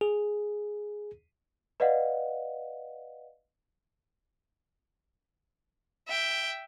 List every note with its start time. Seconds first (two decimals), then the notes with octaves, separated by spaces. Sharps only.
0.01 G#4
1.80 B4 D5 D#5 F5 F#5
6.08 E5 G5